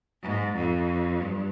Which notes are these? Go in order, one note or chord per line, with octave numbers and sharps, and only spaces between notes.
G#2
F2
G2